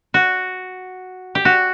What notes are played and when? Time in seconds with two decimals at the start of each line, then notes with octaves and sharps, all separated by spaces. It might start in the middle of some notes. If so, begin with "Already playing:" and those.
0.14 F#4
1.35 G4
1.45 F#4